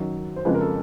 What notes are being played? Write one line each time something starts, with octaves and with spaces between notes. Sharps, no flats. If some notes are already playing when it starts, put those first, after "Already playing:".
Already playing: F#2 D#3 F#3
C5
F2 C#3 F3 G#3 B4
A#4
A4